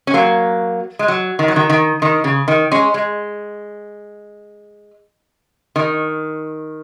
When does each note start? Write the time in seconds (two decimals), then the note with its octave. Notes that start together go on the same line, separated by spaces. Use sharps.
0.07 C#4
0.14 F#3 A#3
0.99 G#3
1.08 F#3
1.39 D#3
1.48 F#3
1.56 D#3
1.70 D#3
2.02 D#3
2.24 C#3
2.48 D#3
2.72 G#3 C#4
2.94 G#3
5.76 D#3